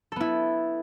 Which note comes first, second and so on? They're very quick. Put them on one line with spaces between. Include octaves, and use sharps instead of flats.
A4 B3 E4